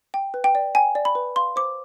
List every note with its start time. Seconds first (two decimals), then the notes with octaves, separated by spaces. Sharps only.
0.14 G5
0.34 B4
0.44 G5
0.55 D5
0.75 G5 G#5
0.95 D5
1.05 B5
1.15 B4
1.36 F5 C6
1.56 C5 D6